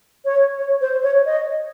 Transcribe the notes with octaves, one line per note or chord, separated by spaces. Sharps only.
C#5
C#5
C5
C#5
D#5